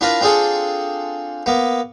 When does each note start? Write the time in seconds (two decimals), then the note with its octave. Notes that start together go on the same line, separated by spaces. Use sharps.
0.01 D4 E4 F4 A#4 B4
0.21 C4 D4 F4 G#4 A4
1.46 A#3 B3